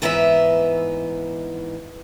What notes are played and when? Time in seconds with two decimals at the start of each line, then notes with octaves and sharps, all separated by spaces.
0.02 G#2 E3 B3 D#4 G4 E5